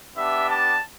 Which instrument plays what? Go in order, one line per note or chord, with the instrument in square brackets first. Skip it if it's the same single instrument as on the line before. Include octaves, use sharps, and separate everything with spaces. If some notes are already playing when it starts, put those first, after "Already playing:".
[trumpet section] B3 D4 G4 E5
A5